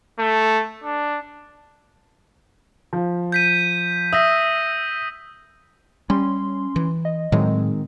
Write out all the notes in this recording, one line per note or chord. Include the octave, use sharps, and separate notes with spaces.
A3
D4
F3
G6 B6 D#7
E5 D#6 E6 A#6
G3 C#4 C6
E3
D#5
A2 D#3 F#3 G#3 C4